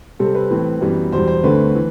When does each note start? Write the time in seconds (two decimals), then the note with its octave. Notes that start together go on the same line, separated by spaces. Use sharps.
0.19 C3 G3 C4 A4
0.35 B4
0.50 A2 E3 A3 C4
0.81 F#2 E3 G3 B3
1.12 E2 B2 G3 C5
1.28 C5
1.43 D2 D3 A3 C4 B4
1.75 E3